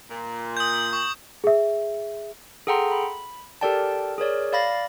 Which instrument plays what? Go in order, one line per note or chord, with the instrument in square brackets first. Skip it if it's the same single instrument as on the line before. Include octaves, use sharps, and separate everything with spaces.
[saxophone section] A#2
[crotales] D#6 G6
C#6
[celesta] G#4 E5
[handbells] G#4 A4 F#5 G5 A#5 C6
B5
G4 A4 A#4 D5 G5 A5
G#4 A#4 C#5 D5
D5 F5 B5 A6 A#6